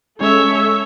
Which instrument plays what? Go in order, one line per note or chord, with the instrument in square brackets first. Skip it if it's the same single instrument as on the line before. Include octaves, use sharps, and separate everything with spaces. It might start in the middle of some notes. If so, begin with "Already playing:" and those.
[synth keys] G#3 C#4 [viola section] A4 [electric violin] C#5 E5